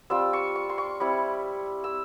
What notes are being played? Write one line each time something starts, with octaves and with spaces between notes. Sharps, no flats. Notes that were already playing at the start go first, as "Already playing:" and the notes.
G3 C4 F4 E6
C#6
C#6
C6
C#6
G3 C4 E4
E6